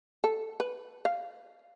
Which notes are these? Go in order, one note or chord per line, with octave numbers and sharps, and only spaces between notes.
A4
B4
F5